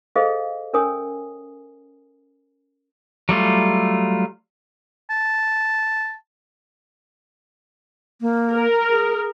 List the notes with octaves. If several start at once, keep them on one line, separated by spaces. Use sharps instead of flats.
G#4 A4 C5 D#5 F5
C#4 A#4 C#5 G#5 D#6
F#3 G3 A3 F4
A5
A#3
A#4
G#4